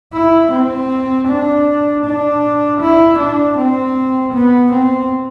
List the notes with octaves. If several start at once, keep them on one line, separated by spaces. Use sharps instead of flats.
E4
C4
D4
D4
E4
D4
C4
B3
C4